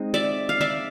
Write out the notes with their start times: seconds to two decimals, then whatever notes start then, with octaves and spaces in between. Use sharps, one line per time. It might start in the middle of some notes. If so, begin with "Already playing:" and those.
Already playing: G#3 C4 D#4
0.14 D5 E5
0.49 F5
0.61 D5 E5